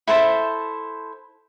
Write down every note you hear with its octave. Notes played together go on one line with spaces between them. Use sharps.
E4 A4 C5 A5